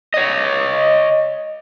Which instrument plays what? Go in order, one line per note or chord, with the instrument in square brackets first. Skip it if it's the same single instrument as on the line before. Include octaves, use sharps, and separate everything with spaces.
[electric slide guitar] C#5 D#5